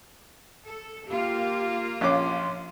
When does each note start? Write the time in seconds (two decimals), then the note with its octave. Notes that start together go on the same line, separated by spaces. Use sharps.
0.66 A4
1.07 A#3 F4 G4
2.01 A#1 C#4 C6 D6